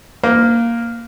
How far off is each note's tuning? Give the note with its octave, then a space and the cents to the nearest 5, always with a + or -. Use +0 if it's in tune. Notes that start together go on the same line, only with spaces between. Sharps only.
A#3 +0 C5 -45